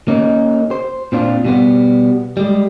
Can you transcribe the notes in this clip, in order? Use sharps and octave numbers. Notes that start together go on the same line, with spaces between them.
A#3 C#4 D#4
C5
A#2 C4 D4 F4
B2 G3 B3
G3 G#3